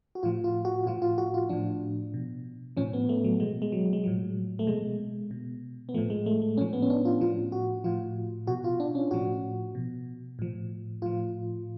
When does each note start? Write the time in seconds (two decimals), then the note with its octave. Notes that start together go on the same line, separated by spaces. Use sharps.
0.15 F#4
0.23 A2 F3 F4
0.44 F4
0.65 F#4
0.86 A2 F3 F4
1.02 F4
1.18 F#4
1.34 F4
1.49 A2 F3 D4
2.14 B2
2.77 A2 F3 C#4
2.93 B3
3.09 A3
3.24 F#3
3.40 B2 G#3
3.62 G#3
3.72 F#3
3.93 G#3
4.04 A2 F3 F#3
4.59 A3
4.67 B2 G#3
5.31 B2
5.89 B3
5.94 F3 A3
5.98 A2
6.10 G#3
6.26 A3
6.42 A3
6.58 A2 F3 C#4
6.73 B3
6.82 C#4
6.90 D4
7.05 F4
7.21 A2 F3 F4
7.52 F#4
7.84 A2 F3 F4
8.47 B2 F#4
8.64 F4
8.80 D4
8.95 C#4
9.11 A2 F3 F#4
9.75 B2
10.39 A2 F3
11.02 A2 F3 F4